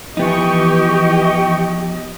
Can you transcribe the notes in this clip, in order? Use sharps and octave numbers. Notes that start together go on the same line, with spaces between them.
E3 F3 B3 D#4 G4 D#5 G5 C#6